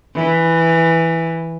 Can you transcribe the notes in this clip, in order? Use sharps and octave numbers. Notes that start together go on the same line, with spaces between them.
E3